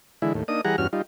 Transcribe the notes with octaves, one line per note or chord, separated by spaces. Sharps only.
D3 E3 G#3 E4
D#2 A2
A#3 D4 D#4 D#6
E3 G3 G#4 F#5 A#5
E2 G2 C#4 F#4 F6
G3 D#4 F4